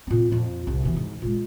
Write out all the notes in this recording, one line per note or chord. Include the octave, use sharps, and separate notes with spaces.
A#2 C4
F2 A#2
C2
B2 E3
G#2
A#2 G#3